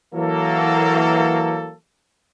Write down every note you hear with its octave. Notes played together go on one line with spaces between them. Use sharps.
E3 F#3 A#3 A4